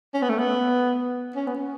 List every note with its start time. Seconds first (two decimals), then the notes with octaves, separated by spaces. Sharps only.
0.14 C#4
0.22 B3
0.29 A3
0.39 B3
1.36 C#4
1.47 B3
1.56 C#4